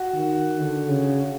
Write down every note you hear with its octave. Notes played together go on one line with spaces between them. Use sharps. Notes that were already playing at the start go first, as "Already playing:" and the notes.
Already playing: F#4
D#3
D3
C#3